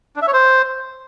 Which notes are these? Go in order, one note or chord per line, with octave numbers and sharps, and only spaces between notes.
D4
E5
C#5
C5